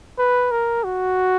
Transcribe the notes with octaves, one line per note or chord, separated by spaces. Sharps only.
B4
A#4
F#4